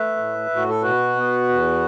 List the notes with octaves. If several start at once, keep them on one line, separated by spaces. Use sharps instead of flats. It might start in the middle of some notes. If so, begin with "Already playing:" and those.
Already playing: A3 B4 E5
A2
A2
F#4
A4
B2 F#4 B4
B3
E2